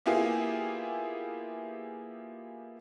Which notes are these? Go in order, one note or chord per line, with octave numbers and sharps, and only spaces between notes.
A#3 B3 E4 F4 G4 G#4